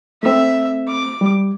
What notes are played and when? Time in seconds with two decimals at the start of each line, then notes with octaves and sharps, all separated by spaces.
0.23 A3 C4 E5
0.88 D6
1.21 G3